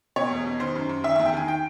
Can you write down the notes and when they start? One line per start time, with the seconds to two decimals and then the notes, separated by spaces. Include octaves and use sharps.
0.16 B2 C#5
0.31 E2
0.45 B2
0.60 D#3 C5
0.75 F#2
0.89 F#2
1.04 D#3 E5
1.16 E2 E5
1.26 G5
1.33 D#3 G#5
1.48 G5